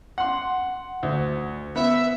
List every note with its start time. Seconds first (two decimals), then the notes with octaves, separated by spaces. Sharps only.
0.18 F#5 C6
1.03 D2
1.76 B3 E5